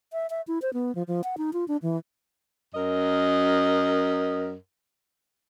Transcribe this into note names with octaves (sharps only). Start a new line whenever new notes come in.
E5
E5
E4
C5
B3
F3
F3
F#5
D#4
F4
D4
E3
F#2 A#4 D#5